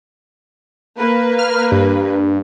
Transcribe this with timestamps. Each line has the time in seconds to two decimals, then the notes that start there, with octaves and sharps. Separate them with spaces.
0.98 A#3 B4
1.39 F6
1.71 G2